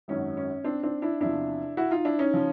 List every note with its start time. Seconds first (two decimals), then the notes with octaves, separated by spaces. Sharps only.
0.08 G#1 F#2 D#3 F#3 C#4
0.37 C#4
0.64 C4 D4
0.83 C4 D4
1.02 D4 E4
1.20 E2 C3 F3 D4 E4
1.77 E4 F#4
1.91 D#4 F4
2.05 D4 E4
2.19 C#4 D#4
2.33 C#3 F3